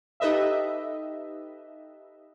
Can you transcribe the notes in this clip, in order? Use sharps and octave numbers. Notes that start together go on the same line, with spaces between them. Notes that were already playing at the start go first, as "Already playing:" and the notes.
D#4 G4 A4 B4 D#5 E5